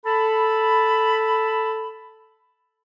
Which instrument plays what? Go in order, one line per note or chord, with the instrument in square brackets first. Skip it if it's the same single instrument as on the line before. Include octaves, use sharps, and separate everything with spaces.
[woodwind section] A4 A5 B5